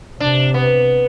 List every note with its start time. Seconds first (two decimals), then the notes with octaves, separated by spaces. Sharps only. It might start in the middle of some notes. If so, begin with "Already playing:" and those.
0.20 C3 D4
0.54 B3